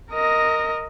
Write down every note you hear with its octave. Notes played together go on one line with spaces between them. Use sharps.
A#4 D#5